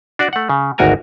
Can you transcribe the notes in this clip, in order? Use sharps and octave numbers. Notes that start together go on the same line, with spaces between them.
D4 F#4 D5
A3 F#5
C#3
G#1 D2 F#4 A#4 G#5 A#5